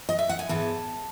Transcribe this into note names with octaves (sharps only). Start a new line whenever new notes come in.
D#5
E5
F#5
G#5
G#2 E3 B3 A5